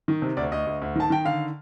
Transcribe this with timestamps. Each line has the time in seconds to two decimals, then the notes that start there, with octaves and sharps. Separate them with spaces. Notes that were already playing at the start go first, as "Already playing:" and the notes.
0.08 D#3
0.22 C3
0.37 D2 D5
0.52 D2 D#5
0.66 D2
0.82 D2
0.95 D#3 A5
1.10 D#3 G5
1.25 D3 F5